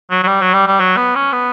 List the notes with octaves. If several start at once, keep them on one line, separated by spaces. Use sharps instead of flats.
F#3
F#3
G3
F#3
G3
G3
F#3
B3
C#4
B3